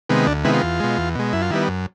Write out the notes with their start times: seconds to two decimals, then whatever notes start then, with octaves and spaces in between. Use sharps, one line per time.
0.10 C3 D#3 G#3 B3
0.27 D2 D4
0.44 C3 D#3 G#3 B3 E4
0.54 F4
0.63 E2
0.80 B2 G#3
0.98 E2
1.15 B2 G#3
1.33 F#2 E4
1.42 F4
1.50 D#3 G3 B3 E4
1.68 F#2